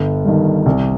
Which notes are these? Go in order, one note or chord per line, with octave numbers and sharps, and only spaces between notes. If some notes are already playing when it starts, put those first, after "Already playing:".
Already playing: G1
G2 D#3
C2